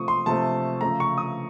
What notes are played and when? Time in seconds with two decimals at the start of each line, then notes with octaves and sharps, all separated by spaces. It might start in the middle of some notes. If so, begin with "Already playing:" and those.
Already playing: C3 F3 A3 C#6 D#6
0.08 C6
0.26 C3 F3 A3 A5
0.81 C#3 F3 A3 A#5
1.00 C#6
1.18 D#6